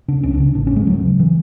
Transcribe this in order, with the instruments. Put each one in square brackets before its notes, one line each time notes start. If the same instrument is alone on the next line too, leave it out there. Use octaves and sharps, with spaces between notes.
[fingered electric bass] C#3 D4
C#2 C#4
D4
C#3
A1 D4
C#4
G#2 G#3
D2 F#3
C#3
E3